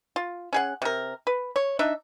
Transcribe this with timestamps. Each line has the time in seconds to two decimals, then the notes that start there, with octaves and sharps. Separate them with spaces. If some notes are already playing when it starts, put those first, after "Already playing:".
0.16 F4
0.53 C#4 G#4 F#5
0.82 C3 A#4
1.27 B4
1.56 C#5
1.79 D4 D#4 E5